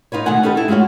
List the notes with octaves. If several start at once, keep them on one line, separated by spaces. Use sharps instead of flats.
D#4 F4 B4 C#5
B2 D#3 A3 B3 F#5 G#5
C#4 D#4 G4 A4 B4
E4 A4
G#3 A3 F4 F#4 C#5